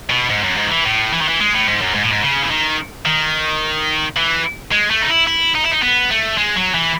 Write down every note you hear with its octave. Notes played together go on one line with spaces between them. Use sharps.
B2
G#2
F#2
G#2
D#3
E3
A2
E3
D#3
E3
G#3
A2
G#2
F#2
G#2
A2
G#2
C#3
E3
D#3
D#3
E3
G#3
A3
D#4
E4
E4
D#4
E4
D#4
B3
A3
G#3
F#3
E3